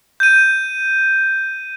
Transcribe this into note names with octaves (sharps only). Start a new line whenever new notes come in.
G6 D#7